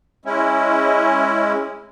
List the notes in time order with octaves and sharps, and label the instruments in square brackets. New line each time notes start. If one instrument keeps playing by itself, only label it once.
[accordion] G#3 C#4 E4